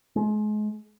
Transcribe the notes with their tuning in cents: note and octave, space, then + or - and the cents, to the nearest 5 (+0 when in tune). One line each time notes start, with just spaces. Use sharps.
G#3 +35